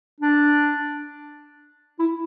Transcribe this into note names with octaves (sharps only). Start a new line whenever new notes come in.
D4
E4